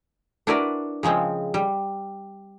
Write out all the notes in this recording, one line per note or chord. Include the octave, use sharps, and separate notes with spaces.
D4 E4 F#4 A#4 B4 D5
C#3 F3 G#3 C4
G3